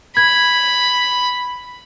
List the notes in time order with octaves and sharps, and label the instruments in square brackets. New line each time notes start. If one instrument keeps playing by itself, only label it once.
[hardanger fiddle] B5 [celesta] G#6